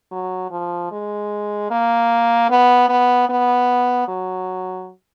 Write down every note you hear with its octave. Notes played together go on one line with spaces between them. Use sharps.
F#3
F3
G#3
A#3
B3
B3
B3
F#3